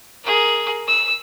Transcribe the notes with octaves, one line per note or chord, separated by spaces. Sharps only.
G#4 A#4
E6